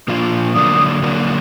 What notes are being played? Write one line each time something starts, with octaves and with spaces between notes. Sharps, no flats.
A#2 F3 A#3 D4 F4
D3 F#3 A#3 D4 D#6
D3 F#3 A#3 D4